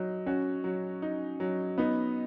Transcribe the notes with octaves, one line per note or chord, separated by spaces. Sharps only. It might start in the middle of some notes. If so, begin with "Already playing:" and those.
Already playing: F#3 D#4
C#4 F#4
F#3
D#4
F#3
B3 D#4